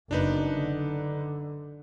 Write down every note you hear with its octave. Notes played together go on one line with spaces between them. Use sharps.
F#1 F#2 D4 D#4 B4
D3